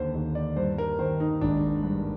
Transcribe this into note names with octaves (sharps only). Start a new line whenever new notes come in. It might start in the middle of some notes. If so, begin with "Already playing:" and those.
Already playing: D#2 D3 C5
D#2
D5
G2 C5
A#4
D#3 C5
D#4
G#1 D4
G2